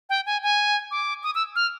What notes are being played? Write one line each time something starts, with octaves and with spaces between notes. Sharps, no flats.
G5
G#5
G#5
D6
D#6
E6
F6